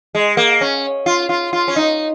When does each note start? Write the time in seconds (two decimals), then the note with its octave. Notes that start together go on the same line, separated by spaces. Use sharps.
0.15 G#3
0.37 A#3
0.61 C#4
1.06 F4
1.29 F4
1.53 F4
1.68 C#4
1.76 D#4